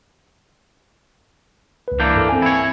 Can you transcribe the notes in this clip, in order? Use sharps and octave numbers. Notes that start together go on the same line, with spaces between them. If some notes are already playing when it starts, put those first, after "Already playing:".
C#2 B4
E3 A#3 D4 G6
G2 A4
C4 G#5
E4 C#5